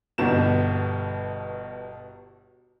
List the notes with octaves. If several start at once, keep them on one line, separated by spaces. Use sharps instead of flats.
G1 G2 B2 E7